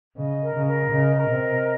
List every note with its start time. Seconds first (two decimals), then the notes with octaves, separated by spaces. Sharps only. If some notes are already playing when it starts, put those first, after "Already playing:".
0.16 C#3 D#5
0.41 A#4
0.55 C#3
0.67 A#4
0.91 C#3 D#5
1.17 A#4
1.29 C3
1.41 D#5